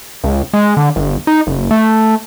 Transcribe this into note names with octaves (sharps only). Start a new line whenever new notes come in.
C#2
G#3
D3
G1
D#4
F#1
A3